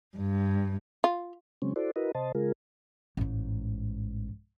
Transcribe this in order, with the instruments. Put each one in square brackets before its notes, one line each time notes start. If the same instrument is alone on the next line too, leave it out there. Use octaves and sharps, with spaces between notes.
[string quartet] G2
[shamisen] F4
[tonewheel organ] C#3 F#3 G#3 C4 C#4
E4 F#4 A4 C5 D5
E4 F#4 A#4 B4 D#5
C3 C5 D#5 A5
C#3 G#3 F4 G#4 A#4
[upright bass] A1 G#2